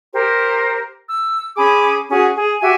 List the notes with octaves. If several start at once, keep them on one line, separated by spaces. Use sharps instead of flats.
G4 A#4 C5
E6
C#4 G#4 B5 D6
C#4 F#4 G#4
G#4
F#4 G4 E5 G#5